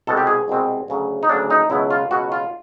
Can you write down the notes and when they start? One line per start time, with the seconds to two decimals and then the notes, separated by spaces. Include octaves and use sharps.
0.07 C2 B2 G#3 C4 A4
0.17 G4
0.27 G#4
0.48 C2 B2 G#3 C4
0.88 D2 C#3 F#3
1.23 D#4
1.29 D2 C#3 F#3 D4
1.50 D#4
1.70 C#2 B2 F#3 B3 E4
1.91 F4
2.11 C#2 B2 F#3 B3 F#4
2.32 F4